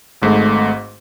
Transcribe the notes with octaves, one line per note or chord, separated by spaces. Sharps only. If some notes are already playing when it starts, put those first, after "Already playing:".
G#1 G#2 A3